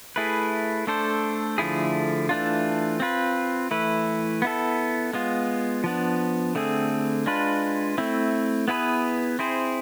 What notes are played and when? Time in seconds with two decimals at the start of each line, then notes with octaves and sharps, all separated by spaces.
0.16 A3 E4 G#4 B4
0.87 A3 D4 A4 C5
1.58 D3 F3 A3 E4 G#4
2.29 E3 A3 D4 F4
3.00 C4 F4 B4
3.71 E3 A3 E4 B4
4.42 B3 E4 A4
5.13 G#3 B3 F4
5.84 F3 B3 D4
6.55 D3 A3 C4 G#4
7.26 G#3 D4 F4 B4
7.98 A3 C4 E4
8.68 B3 E4 G#4 B4
9.39 C4 E4 G#4 C5